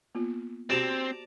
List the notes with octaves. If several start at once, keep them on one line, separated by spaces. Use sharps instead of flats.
A#3 B3 F4
C4 F#4 G4 C5 D5 A5 A#5